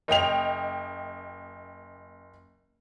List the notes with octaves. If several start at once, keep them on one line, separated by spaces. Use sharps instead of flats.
F#1 D#5 G5 F7